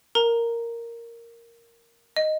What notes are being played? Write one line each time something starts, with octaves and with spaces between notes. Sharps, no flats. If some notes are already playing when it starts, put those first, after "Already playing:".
A#4 A#5
D#5